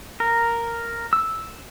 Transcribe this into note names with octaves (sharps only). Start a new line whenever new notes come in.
A#4
E6